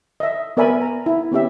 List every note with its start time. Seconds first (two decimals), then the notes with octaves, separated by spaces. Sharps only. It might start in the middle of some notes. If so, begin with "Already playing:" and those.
0.20 D#5 E5
0.57 B3 A#4 D5 E5 G#5 B5
0.82 A#5
1.06 E4
1.32 B3 C#4 G4 E5